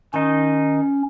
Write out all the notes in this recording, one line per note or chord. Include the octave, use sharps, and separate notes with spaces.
D#3 C#4 D#4